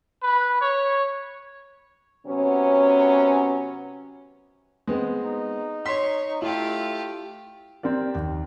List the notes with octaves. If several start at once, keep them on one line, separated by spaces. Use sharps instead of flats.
B4
C#5
C3 F#3 B3 C#4
G#3 B3 C4
D#4
C#5 C6 B6
A3 E4 F4 G4
C4 G4 A#4 D5
D#2